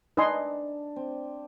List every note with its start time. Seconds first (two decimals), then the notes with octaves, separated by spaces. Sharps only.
0.17 D4 D#4 B4 D#5 G#5 C6
0.96 C4